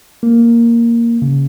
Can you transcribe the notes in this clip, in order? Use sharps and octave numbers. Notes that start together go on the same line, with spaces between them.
A#3
C#3